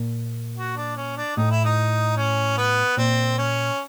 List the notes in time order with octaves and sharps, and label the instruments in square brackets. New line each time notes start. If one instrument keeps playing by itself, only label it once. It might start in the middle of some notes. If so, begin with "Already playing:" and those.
Already playing: [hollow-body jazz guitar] A#2
[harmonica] F#4
D4
C#4
D4
[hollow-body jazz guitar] A2 [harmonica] D#4
[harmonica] E4
D#4
C#4
B3
[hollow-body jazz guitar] A#2 [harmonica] C4
[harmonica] C#4